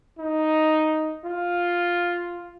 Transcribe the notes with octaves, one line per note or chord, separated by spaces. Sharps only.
D#4
F4